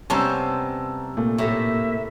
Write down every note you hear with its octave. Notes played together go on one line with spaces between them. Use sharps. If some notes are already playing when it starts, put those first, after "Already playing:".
C3 G3 B3 C#4 C5 A5 A#5 E6
A#2 A3
A2 A#3 G4 A4 E5